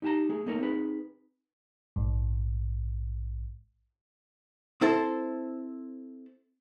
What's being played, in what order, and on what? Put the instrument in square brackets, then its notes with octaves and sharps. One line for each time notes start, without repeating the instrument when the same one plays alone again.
[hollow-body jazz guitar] D#4 G4 F#5 A5 A#5
A3 G#4
A3 A#3 C#4 D#4 A4 A#4
C4 D#4 G#4 B4
[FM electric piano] A#1 G#2
[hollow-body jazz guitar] C4 E4 A4 C5